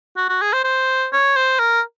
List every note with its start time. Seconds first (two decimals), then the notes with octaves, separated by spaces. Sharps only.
0.17 F#4
0.29 F#4
0.42 G#4
0.53 C5
0.64 C5
1.12 C#5
1.36 C5
1.59 A#4